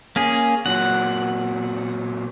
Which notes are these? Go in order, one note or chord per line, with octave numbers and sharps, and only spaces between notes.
A#3 C#4 G#4
A#2 F#3 F#5